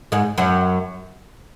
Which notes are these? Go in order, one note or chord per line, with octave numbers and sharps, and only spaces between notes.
G#2 G#3
F#2 F#3